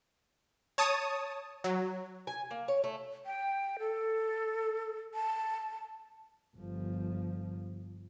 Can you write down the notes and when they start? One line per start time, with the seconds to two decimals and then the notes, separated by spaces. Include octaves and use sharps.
0.78 C#5 A5 D#6
1.64 F#3
2.27 G#5
2.51 A#3
2.68 C#5
2.84 A3
3.26 G5
3.79 A4
5.14 A5
6.57 G1 F3